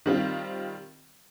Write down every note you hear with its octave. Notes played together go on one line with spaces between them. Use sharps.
D#3 G3 C4 F4